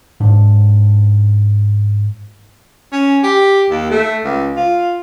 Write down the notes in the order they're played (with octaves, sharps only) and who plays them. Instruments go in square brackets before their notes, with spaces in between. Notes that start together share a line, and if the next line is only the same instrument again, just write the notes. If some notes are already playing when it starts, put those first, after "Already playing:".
[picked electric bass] G#2 D4
[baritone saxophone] C#4
G4
D#2
A3
C#2
F4